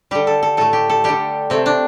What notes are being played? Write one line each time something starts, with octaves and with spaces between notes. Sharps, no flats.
D3 G3 G4
A4
A4
A2 A3 A4
G4
A4
D3 G3 G4
C3 A3 C4
D4